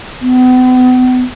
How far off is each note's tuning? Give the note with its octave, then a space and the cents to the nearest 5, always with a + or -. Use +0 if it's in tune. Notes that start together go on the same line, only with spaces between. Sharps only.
B3 +40